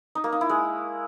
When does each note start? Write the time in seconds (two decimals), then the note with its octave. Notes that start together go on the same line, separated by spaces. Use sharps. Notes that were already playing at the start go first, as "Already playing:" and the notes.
0.15 D#4
0.24 A#3
0.32 D#4
0.41 E4
0.49 G#3